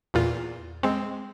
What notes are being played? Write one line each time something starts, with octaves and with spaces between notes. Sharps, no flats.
E2 A#2 F4
G#3 C4